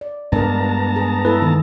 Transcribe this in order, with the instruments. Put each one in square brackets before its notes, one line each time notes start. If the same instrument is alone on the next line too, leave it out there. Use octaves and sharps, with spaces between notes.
[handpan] D5
[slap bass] G2 G#3 [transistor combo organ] B3 A5 A#5 [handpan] D4 A#4
[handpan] G#4
[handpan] E4 A4 [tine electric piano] B4
[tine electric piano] D#3 [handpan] E3